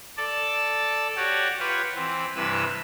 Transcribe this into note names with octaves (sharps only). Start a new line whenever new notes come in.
A4 D5 A5
F#4 G4 C#5 D5
F4 G4 B4 C#5 F#5
E3 C4
G2 C3 E3 B4 E6